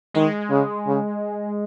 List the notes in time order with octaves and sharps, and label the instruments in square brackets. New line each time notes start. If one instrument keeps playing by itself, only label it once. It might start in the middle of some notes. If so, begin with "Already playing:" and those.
[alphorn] D#3 [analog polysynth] G#3
[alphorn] C#3
C#3